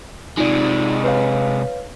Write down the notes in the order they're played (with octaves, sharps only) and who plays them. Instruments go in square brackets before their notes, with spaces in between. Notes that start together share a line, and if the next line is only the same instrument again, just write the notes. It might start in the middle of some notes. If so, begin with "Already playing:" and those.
[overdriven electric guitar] C3 G#3 [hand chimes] D#4 F4 D5
[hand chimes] B4 C#5 F5